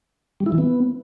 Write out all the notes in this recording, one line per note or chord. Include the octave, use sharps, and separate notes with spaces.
G3
E4
E3
B3